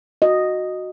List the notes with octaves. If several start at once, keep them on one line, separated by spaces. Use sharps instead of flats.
F#4 D#5